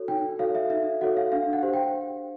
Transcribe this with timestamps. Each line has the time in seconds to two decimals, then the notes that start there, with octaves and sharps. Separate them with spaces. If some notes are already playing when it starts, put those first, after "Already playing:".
Already playing: F#4 A4 C#5
0.08 D#4 G5
0.39 F#4 A4 C#5 F5
0.55 E5
0.70 D#4 E5
1.01 F#4 A4 C#5 F#5
1.17 F5
1.32 D4 F5
1.53 F#5
1.63 G4 C5
1.74 G5